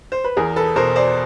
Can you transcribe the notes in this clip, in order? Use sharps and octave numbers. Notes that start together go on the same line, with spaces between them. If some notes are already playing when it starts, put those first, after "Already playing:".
C5
B4
E2 G#4 A#4
A4 B4
B2 A#4 C5
C5 D5